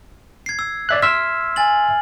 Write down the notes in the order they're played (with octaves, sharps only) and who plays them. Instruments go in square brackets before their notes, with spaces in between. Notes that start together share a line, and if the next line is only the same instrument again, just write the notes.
[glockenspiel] G#6 C7
E6
[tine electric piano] D5 E5 F#6
[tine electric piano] E5 C6 E6 [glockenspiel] F6
[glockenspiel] G#5 A6 F#7